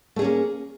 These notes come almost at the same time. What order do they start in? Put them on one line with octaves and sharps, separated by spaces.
A3 G#4 C#4 A#3